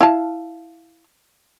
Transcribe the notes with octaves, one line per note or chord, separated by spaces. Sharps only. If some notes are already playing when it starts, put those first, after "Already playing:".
E4 F5 A5